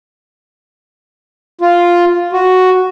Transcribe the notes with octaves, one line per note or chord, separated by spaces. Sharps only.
F4
F#4